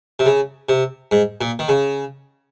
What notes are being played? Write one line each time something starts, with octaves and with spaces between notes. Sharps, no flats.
C3
C#3
C3
G#2
A#2
D#3
C#3